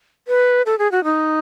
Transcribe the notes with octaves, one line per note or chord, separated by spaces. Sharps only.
B4
A4
G#4
F#4
D#4